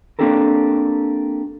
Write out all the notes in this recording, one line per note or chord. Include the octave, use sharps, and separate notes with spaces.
A#3 C4 D4 G4 A4 A#4